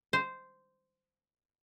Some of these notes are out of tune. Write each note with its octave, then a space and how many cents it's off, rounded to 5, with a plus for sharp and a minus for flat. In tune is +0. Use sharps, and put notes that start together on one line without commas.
C5 -10